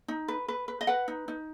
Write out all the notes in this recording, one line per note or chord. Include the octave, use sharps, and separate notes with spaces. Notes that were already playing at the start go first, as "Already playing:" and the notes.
D#4
B4
B4
B4
D#5
B4 F#5
D#4
D#4